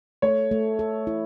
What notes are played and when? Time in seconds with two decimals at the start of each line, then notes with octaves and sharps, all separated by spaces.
0.22 A3 C#5
0.51 A3
0.79 A4
1.07 E4